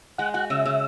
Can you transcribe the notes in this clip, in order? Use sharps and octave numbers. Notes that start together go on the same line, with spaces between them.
G#3 F#5
F#4 F#5
C#3 E5
C#3